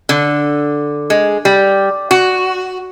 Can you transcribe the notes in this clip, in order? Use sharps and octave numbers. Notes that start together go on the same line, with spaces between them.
D3
G#3
G3
F#4